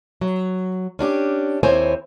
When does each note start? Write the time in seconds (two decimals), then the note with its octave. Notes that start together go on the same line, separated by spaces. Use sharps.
0.21 F#3
0.99 C#4 D4 F#4 G4
1.63 D#2 C4 E4 C5 C#5 G#5